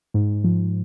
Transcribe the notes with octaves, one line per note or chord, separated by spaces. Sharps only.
G#2
F3